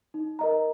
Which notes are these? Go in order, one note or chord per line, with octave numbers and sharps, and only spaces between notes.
D#4
A#4 D#5 A#5